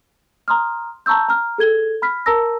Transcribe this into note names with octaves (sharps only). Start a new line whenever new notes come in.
A#5 C6 D#6 F6
A5 A#5 C#6 E6 G6
A#5 F6
G#4 A4 G#6 G7
B5 F6 B6
A#4 A5 A#5 E6 A#6